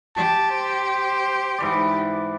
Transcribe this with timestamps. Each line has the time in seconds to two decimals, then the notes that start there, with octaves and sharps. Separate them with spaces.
0.17 G4 A5
0.51 C5
1.58 G#2 E3 D5